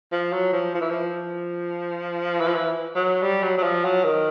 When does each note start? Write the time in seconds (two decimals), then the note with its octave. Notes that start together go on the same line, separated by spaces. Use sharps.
0.12 F3
0.32 F#3
0.53 F3
0.74 F3
0.81 E3
0.90 F3
2.40 E3
2.47 F3
2.54 E3
2.95 F#3
3.22 G3
3.43 F#3
3.58 F#3
3.63 F3
3.85 F#3
4.04 D#3